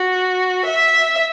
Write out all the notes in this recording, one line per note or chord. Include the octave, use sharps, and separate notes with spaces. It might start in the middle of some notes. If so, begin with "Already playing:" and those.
Already playing: F#4
E5